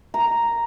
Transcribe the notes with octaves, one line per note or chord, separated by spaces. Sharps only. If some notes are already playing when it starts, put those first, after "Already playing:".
A#5